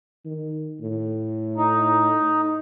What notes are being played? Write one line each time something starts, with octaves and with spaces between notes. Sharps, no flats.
D#3
A2
D#4